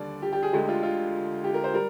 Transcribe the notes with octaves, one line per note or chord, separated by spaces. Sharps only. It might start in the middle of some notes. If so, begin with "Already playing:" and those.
Already playing: D#2 D3 G3 D5
G4
G4
G#4
D2 D3 G#3 G4
F4
F4
G4
A#4
C5
G3 A#4